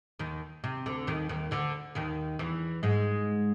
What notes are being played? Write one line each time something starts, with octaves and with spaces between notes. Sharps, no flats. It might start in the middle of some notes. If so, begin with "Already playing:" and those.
D#2 D#3
C3
D2 D3
D#2 D#3
D#2 D#3
D2 D3
D#2 D#3
E2 E3
G#2 G#3